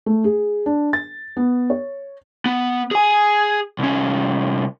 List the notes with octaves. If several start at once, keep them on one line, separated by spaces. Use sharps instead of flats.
A3
G#4
D4
A6
B3
C#5
B3
G#4 G#5
C2 C#4